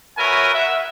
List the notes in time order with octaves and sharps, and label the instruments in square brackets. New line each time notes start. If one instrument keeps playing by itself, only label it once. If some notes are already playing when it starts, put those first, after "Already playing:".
[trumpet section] F#4 A#4 B4 C#5 E5 G#5
E5 F#5